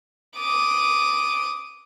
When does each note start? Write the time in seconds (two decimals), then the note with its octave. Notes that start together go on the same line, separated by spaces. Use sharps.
0.36 D6 D#6